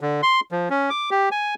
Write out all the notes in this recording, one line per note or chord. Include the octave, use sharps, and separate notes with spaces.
D3
C6
F3
C#4
D6
G4
G#5